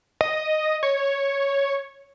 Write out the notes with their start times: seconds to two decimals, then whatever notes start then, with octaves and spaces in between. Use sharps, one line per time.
0.21 D#5
0.83 C#5